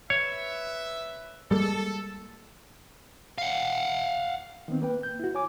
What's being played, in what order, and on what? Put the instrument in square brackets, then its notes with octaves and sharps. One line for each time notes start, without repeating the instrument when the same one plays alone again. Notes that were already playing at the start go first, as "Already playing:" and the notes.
[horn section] B4 E5 [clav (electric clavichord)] C#5
[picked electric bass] G3 G#3 A#3 [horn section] A4
[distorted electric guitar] F5 F#5
[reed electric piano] D#3 B3 C4
A#3 B4 G5
G6
E4 F#4
C#5 G#5 D6